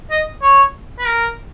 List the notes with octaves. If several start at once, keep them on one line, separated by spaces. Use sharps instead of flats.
D#5
C#5
B4
A#4